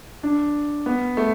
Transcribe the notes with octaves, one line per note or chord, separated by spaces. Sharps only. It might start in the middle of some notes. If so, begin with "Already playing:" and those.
D4
B3
A3